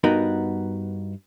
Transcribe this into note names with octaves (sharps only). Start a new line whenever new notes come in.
G2 B3 D#4 F#4 A#4 B5